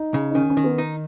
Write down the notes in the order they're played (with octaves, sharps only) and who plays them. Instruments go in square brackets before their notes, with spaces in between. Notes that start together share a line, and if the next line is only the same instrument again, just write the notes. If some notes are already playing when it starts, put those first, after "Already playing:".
Already playing: [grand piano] D#4
[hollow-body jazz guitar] C#3
[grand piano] D#4
[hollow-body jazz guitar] D#3 [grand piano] C#4
[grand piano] C#4
[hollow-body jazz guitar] D#3
[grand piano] B3
[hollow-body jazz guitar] D#4